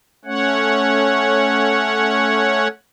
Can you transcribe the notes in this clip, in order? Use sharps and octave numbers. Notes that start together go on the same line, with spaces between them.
A3 C#4 C#5 F#5